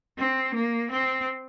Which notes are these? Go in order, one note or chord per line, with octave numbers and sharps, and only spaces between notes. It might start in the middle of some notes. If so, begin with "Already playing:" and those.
C4
A#3
C4